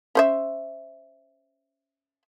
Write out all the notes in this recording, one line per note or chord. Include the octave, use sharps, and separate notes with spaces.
C#4 C5 E5